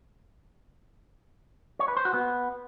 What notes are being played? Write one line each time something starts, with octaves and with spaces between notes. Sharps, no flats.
C#5
B4
C5
F#4
B3